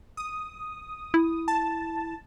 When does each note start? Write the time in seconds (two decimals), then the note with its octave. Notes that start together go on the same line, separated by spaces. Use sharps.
0.17 D#6
1.14 E4
1.48 A5